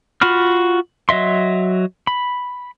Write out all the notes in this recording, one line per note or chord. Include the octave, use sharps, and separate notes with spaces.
F4 F#4 B5 F6
F#3 D#5 E5 C6
B5